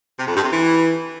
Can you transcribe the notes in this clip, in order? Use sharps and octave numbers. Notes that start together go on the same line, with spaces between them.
C3
F2
G2
C3
E3